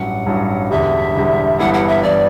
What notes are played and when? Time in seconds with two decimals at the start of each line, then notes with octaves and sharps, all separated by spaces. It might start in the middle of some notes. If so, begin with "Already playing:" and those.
Already playing: A1 G2 F#3 F#5
0.26 A1 G2 F#3
0.71 E1 E2 D3 G3 E5
1.15 E1 E2 D3 G3
1.59 G1 G2 E3 B3 E4 F#5
1.74 F#5
1.88 E5
2.03 G1 E3 B3 E4 D5